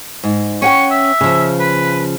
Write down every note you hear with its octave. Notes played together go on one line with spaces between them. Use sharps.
G#2
C#4 F#5 G5 C#6
E5
C#3 F3
B4